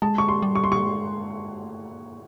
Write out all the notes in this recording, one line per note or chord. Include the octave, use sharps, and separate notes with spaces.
G#3 A5
C#6
C6
G3
C#6
C6
C#6
G#3
A3
A#3